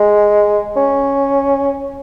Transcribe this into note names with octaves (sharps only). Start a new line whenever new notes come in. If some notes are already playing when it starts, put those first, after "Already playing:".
Already playing: G#3
C#4